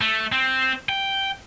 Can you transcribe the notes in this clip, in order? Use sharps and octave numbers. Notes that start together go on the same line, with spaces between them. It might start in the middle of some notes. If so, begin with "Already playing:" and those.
A3
C4
G5